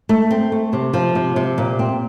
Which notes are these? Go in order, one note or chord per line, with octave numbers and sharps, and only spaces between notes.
A3
C4
A3
C3
F3
C3
C3
A#2
C4